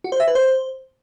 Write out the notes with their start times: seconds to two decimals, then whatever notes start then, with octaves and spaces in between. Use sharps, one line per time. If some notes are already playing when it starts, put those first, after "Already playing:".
0.04 F#4
0.12 C5
0.20 E5
0.28 B4
0.35 C5